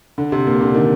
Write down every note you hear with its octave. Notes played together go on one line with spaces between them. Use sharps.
D3
C3
A#2
D3
D#3